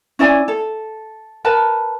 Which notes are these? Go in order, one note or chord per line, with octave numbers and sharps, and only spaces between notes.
C#4 E4 D5 G#5
A4
A#4 B4 A5